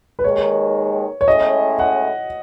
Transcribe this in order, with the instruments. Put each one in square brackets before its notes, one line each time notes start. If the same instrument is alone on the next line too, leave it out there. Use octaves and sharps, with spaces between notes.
[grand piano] B4
[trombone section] D#2 D#3 G#3 [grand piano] C#5
[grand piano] C#5
[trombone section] A2 G#3 C#4 [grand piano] D#5
[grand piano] F#5